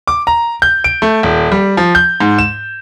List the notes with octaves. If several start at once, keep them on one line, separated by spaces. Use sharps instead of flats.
D6
A#5
G6
D7
A3
D#1
G3
F3
G6
G#2
E7